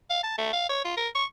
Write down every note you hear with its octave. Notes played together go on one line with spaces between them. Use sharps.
F5
A5
A3
F5
C#5
F4
A#4
C#6